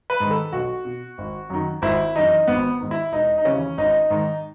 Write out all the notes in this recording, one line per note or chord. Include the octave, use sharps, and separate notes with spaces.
B4
G#2 D#3
A4
B1 F#4
B2
G#1
F#2 D#3
G#1 E4
F#2 E3 D#4
G#1 B3
G#2 D#3
E4
E1 D#4
D#4
D#2 C#3 E3 C#4
G#1 D#4
G#2 D#3